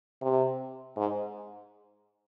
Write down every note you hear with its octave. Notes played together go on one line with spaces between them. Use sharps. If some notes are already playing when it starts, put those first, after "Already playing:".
C3
G#2